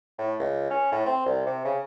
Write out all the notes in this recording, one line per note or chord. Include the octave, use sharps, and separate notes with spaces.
A2
C#2
C#4
A2
C4
C2
C3
C#3